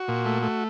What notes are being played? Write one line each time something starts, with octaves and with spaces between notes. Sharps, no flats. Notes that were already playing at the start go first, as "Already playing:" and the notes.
Already playing: F#4
A#2
A3
A3